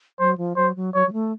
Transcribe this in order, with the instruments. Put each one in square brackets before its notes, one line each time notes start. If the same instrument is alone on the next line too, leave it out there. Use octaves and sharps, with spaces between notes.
[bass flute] F#3 [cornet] C5
[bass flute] F3
[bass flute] F#3 [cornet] C5
[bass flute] F#3
[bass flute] F#3 [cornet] C#5
[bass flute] F#3
A3